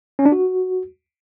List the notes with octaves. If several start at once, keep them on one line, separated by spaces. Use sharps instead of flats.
C#4
D4
F#4